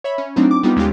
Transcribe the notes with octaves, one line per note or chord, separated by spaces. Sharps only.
C#5 E5 B5
C#4
F#3 A3 C4 D4 D#4 F4
D6
G3 B3 D#4 F4 G4
D#2 G#3 C#4 F4 G4